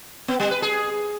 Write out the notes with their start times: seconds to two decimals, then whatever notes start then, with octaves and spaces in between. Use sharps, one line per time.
0.28 B3
0.40 G3
0.51 B4
0.62 G#4